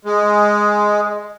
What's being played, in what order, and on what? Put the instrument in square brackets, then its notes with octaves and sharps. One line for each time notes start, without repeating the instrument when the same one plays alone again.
[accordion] G#3